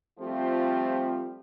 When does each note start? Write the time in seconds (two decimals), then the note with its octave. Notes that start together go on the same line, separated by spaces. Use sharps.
0.19 F3 G3 A3 C4 F4 G4